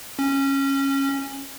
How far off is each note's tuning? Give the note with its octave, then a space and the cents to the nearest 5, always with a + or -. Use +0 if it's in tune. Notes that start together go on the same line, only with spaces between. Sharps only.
C#4 -15